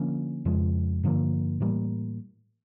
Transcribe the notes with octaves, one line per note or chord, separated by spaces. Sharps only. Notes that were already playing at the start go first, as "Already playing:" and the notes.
Already playing: D3 F3 A#3 C#4
F2 C#3 F3 G#3
G2 D3 F3 A#3
A2 E3 G3 A#3